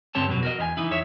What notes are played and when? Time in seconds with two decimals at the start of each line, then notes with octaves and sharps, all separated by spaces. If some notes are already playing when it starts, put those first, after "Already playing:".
0.15 G2 D3 C4 G4 C#5 A5
0.29 F2 B2 F#3
0.43 F#4 A#4 D#5
0.59 E2 D#4 G#5
0.77 E3 D#4 E4
0.91 F2 C#5 E5